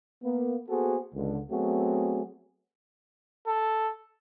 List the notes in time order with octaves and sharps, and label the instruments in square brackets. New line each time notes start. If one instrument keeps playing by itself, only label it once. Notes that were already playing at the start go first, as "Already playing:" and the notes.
[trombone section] A#3 B3
A#3 B3 F#4 G#4 A4 C5
C#2 D3
F#3 A3 B3 C4 F#4 G#4
[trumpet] A4